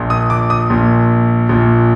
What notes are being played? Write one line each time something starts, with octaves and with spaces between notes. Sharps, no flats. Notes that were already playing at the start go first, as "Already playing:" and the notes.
Already playing: A#1 A#2
D#6
D6
D#6
A#1 A#2
A#1 A#2